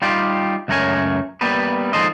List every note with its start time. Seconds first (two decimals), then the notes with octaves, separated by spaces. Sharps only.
0.02 G3 D#4 F4 G4
0.68 C#2 F#2 A3 A#4 C#5 G#5
1.41 G3 A#3 B3 B4
1.93 F3 G#3 D#4 A4 C5 D#5